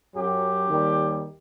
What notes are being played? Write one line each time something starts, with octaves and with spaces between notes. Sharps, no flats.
F#2 F#3 G4
D#2 D#3 G3